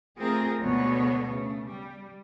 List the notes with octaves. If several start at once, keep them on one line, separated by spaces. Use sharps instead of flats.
A3 C4 F4 G#4 A#4
D2 B2 D3 G#3 B3 C#5
C#3 A3
G3